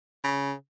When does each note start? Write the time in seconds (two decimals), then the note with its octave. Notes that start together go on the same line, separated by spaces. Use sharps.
0.24 C#3